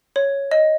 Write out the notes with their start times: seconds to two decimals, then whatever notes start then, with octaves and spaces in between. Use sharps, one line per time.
0.16 C#5
0.51 D#5